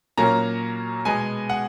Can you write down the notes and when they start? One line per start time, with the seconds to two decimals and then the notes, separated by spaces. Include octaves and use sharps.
0.17 A#2 F#3 A#3 C#4 A#5
1.05 B2 G#3 B3 G#5
1.50 F#5